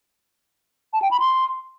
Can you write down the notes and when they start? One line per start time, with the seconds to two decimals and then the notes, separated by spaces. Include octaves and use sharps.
0.93 A5
1.02 G5
1.11 B5
1.20 C6